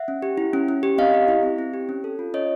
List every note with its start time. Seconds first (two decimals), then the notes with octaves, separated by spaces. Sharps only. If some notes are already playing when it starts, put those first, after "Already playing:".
Already playing: E5 F#5
0.08 C#4
0.22 G4
0.38 E4
0.53 C#4
0.68 C#4
0.83 G4
0.98 C4 D#5 F5
1.14 G4
1.28 E4
1.43 C4
1.58 C4
1.74 G4
1.89 C#4
2.04 A4
2.19 F4
2.34 C#4 C#5 D#5